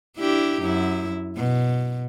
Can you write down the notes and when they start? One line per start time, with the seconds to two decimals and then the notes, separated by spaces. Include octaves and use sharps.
0.17 D4 E4 G4
0.62 F#2 E4
1.37 B2